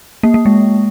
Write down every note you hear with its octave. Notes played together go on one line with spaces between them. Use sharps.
A#3
A#3
G#3